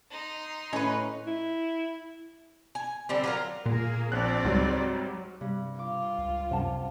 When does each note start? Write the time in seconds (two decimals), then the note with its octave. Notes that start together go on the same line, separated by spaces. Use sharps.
0.11 D#4 C6
0.73 A2 C#4 B4 D#5
1.27 E4
2.75 G#5
3.09 D3 G3 C4
3.24 F#3 F4 A#4
3.66 A#2 A#3 G#4
4.12 A#1 C4 D5 F#6
4.44 C#2 G#2 F#3 G3
5.41 G2 C3
5.79 F4 D6
6.18 C#2
6.51 C3 F#5 A5